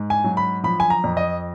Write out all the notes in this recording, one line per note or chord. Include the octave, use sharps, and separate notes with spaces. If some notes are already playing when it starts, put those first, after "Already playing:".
Already playing: G#2
G#5
F#3
B5
F3 B5
G#5
A#5
F2
D#5